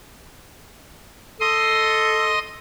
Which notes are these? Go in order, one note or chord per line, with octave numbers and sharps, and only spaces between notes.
A4 D#5 C6 D#6